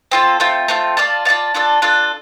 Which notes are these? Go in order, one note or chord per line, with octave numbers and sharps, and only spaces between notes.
C4 F4 A4
A3 C4 F4
A3 C4 F4
F4 D5 F5 A5
F4 D5 F5 A5
D4 F4 A4 D5
D4 F4 A4 D5